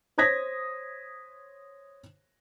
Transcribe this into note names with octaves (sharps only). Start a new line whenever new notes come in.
C5 C#5 D#6 G#6 A#6 B6